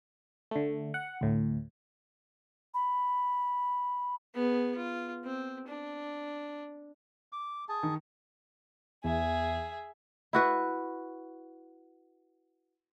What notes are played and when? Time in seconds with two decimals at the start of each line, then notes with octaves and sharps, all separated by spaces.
0.51 D3 A3
0.94 F#5
1.21 D2 A2
2.74 B5
4.34 B3 G#4
4.76 F4
5.24 C4
5.67 D4
7.32 D6
7.69 G#4 A5
7.83 D#3
9.04 E2 G#4 E5
10.33 E4 F#4 B4